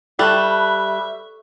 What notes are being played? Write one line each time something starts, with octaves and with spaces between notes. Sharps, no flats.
G3 A4 B4 E5 A5 C#6